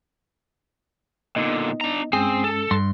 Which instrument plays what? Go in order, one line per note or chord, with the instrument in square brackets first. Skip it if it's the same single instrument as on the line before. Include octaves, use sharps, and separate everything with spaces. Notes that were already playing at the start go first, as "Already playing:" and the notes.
[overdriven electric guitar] A#2 D3 [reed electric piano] B3 D#4 D#5
[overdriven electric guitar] D4 A#5
[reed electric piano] G2 G#3 C#4 [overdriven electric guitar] C4 [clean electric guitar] G#4
[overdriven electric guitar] A4
[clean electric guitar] G2 C6